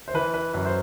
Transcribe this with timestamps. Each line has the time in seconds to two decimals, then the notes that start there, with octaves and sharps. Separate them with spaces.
0.08 C5
0.14 E3 B4
0.34 B4
0.54 F#2 B4
0.65 C5